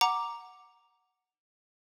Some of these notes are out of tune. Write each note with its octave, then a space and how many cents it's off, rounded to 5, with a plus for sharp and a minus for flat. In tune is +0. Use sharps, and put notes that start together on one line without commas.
F#5 +0 A#5 +0 D6 +0